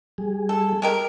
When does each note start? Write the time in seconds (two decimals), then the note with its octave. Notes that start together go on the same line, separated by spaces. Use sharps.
0.18 G3 G#4
0.49 A4
0.82 G#3 G4 A#4